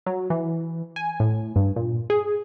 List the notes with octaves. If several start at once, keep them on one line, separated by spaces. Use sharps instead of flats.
F#3
E3
G#5
A2
G2
A#2
G#4